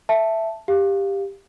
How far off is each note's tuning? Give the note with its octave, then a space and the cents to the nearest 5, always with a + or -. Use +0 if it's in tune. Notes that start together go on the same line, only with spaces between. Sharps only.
E5 +5 A5 +0
G4 +10 F5 +0